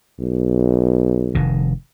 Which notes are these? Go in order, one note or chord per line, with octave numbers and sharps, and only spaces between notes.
B1
F1 D#3